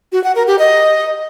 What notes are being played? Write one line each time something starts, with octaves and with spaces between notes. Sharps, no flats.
F#4
F#5
A#4
G4
D#5